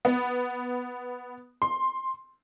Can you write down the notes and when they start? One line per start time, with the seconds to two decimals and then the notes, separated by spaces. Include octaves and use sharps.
0.05 B3
1.62 C6